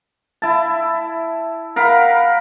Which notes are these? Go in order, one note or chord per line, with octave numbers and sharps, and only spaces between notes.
E4 A5
A#4 F5 F#5 B5